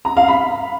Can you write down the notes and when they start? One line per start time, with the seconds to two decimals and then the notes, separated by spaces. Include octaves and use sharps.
0.05 A#5
0.17 F5
0.28 B5